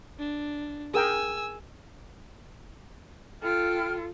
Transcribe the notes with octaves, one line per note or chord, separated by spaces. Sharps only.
D4
G#4 A#4 G5 G#5 E6
F4 A4 G5 F6